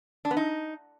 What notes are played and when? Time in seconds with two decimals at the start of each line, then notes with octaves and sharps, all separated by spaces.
0.25 D4
0.31 B3
0.37 D#4